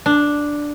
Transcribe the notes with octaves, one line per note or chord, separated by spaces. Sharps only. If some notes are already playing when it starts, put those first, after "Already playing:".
D4